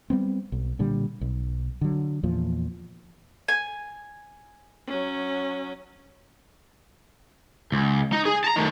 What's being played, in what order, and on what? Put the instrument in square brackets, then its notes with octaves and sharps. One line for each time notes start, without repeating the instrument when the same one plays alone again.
[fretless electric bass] G3 B3 C4
B1
A#2 D3 G3
B1
D3 F#3
E2 A#2 F3
[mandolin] G#5
[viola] F#3 C#4
[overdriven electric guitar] C#2
D#4
G#4
A5 A#5
D#3 A3